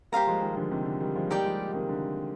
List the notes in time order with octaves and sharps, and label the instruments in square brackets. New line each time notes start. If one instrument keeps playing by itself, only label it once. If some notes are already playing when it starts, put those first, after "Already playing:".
[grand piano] G3 A#3 [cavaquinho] G4 C5 F5 A#5
[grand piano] F3 G#3
D#3 G3
D3 F3
C3 D#3
D3
D#3 G3
F3 G#3
[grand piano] G3 A#3 [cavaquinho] D#4 G4 D5 G5
[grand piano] F3 G#3
C3 D#3
D3